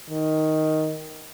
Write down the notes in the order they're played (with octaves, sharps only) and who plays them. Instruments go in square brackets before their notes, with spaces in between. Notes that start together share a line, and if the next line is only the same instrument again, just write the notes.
[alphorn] D#3